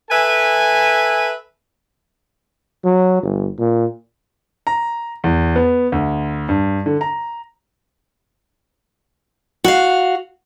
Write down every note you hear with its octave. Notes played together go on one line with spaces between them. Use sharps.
A4 B4 E5 G#5
F#3
G1
A#2
A#5
E2
B3
D2
G2
D3
A#5
F#4 F5